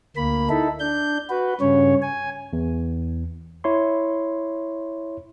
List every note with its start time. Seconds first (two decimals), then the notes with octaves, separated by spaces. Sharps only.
0.16 D2 A#3 B5
0.49 D#4 E4 A4
0.80 D4 G6
1.30 F#4 B4
1.61 G2 C#3 C#4 C#5
2.02 G#5
2.53 E2
3.64 E4 C#5 C6